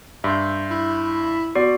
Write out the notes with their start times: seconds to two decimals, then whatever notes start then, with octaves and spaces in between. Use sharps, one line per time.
0.24 G2 E5 C6 G6
0.71 E4
1.55 B3 F#4 D5